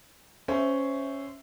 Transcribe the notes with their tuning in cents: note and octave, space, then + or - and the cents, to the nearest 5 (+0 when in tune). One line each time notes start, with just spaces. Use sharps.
C#4 +0 C5 -15 E5 +0